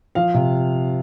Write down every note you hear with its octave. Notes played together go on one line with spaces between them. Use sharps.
F3 F5
C3